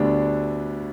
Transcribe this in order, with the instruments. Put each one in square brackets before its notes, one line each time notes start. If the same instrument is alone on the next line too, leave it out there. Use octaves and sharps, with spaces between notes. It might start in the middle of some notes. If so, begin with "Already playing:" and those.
Already playing: [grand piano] D2 D3 G3 B3 D4